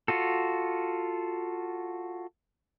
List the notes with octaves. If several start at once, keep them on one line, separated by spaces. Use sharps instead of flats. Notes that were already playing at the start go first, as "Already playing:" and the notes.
F4 F#4 A4